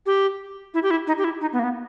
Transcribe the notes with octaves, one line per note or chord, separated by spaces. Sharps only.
G4
E4
G4
E4
D#4
G4
E4
D#4
B3
A#3
B3